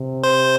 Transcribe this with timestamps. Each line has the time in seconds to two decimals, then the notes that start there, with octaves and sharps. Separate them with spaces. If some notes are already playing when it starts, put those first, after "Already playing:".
Already playing: C3
0.24 C5